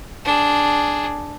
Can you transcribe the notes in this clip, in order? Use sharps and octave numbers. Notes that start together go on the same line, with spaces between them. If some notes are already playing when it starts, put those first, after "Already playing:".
D4 G#4